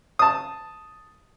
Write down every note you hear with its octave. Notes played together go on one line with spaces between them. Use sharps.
A5 D#6